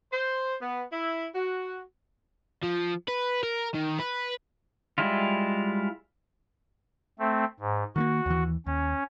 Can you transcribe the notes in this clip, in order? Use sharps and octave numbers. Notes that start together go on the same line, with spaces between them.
C5
B3
E4
F#4
F3
B4
A#4
D#3
B4
G3 G#3 E4 F4
A3 C4
G#2
D#3 A3 A#3 F#4
D#2 E3
D#2 C#4